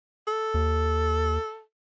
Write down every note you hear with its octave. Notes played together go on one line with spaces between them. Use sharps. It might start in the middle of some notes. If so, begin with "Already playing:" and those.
A4
D#2